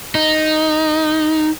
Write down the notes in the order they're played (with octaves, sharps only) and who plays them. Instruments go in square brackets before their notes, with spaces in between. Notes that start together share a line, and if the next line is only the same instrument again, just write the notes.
[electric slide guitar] D#4